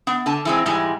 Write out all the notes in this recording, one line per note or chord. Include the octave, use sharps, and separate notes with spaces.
B3
D3 A5
E3 G#3 C4
G#2 E3 G3 G#3